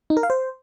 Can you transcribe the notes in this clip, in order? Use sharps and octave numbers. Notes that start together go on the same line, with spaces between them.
D#4
A#4
F5
C5